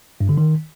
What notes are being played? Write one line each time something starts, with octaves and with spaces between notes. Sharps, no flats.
G2
D3
D#3